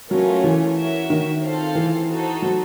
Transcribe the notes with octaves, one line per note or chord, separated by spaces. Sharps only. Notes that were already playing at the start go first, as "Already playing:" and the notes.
F#3 A3 C#4 F4 A#4
E3
F#4 A#4 C#5 E5
D#3
C4 F4 A4 C5 F5
E3
D#4 F#4 A4 C5
F#3